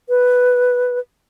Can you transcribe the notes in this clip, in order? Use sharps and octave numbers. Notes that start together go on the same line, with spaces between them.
B4